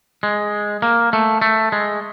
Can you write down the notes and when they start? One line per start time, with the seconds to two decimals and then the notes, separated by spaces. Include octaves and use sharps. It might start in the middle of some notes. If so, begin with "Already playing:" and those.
0.23 G#3
0.82 A#3
1.13 A3
1.42 A3
1.72 G#3